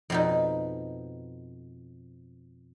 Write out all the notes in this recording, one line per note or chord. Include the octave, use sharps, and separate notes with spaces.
F2 B2 D#4